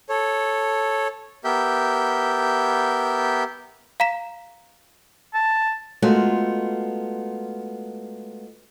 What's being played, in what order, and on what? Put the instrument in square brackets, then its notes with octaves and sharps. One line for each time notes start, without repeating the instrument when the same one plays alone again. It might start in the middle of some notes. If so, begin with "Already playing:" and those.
[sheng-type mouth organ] A4 C#5
B3 G4 A#4 E5 G6
[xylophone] F5 A#5 B6 E7
[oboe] A5
[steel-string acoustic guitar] G#3 A3 B3 F4 F#4 A#4